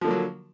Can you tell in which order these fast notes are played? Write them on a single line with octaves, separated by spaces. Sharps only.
F3 D3 A#3 F#3